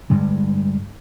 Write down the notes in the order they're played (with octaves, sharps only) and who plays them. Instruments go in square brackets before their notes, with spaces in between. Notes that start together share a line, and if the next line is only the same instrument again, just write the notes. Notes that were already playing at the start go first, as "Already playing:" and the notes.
[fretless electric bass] G2 D3 G3 G#3